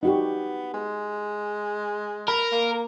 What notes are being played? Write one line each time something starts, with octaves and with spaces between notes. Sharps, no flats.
B3 D#4 F#4 G4
G#3
A#4 B5
A#3